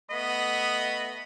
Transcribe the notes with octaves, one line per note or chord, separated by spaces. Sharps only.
A3 B3 D#5 B5